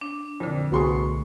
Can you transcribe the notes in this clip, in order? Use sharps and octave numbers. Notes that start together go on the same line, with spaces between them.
D4
F2 A#2 D3
C2 A3 B3 F#4 G#4 C6 C#6